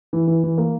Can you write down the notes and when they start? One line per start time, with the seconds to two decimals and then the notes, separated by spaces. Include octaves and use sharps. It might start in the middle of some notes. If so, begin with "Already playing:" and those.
0.13 E3
0.27 E3
0.43 E3
0.58 A#3